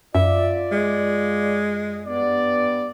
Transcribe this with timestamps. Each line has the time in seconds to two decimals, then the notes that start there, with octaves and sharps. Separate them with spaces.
0.15 F#2 F4 D5 E5
0.72 G#3
2.07 G2 B3 D5